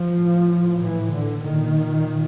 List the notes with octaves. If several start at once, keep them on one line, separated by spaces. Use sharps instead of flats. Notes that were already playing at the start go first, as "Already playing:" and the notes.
Already playing: F3
A2
E3
D3
A#2 D#3